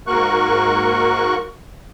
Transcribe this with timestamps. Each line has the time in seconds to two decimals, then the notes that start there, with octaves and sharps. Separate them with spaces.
0.07 G#2 A#3 F#4 A#4 C#6 F#6